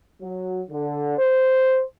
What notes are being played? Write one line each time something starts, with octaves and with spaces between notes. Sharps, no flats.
F#3
D3
C5